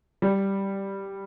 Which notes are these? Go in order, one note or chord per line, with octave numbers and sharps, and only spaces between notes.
G3